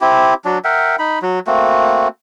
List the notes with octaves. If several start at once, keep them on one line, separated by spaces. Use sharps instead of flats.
C4 E4 G4
F#3 D4
A#4 E5 F#5 G5
D#4 B5
F#3
A3 A#3 C4 F#4